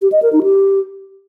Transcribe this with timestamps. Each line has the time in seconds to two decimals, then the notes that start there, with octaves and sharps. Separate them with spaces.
0.02 G4
0.12 D#5
0.22 A#4
0.32 D#4
0.43 G4